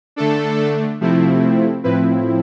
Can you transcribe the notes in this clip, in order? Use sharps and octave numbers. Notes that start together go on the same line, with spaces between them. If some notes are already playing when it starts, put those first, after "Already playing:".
D3 A3 D4 A4
C3 F3 A3 C4 E4
A2 F3 C4 E4 B4